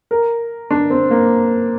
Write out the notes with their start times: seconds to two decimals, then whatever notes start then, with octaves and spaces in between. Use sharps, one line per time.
0.11 A#4
0.71 D4
0.90 C4
1.10 A#3